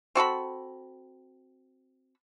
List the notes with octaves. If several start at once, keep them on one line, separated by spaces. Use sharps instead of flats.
C4 F#4 A4 B5